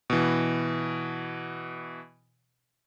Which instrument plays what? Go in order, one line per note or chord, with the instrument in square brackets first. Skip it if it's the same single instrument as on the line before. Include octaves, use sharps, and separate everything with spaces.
[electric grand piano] B2 E3